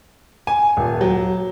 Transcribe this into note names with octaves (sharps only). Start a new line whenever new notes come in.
G#5
D#1
F#3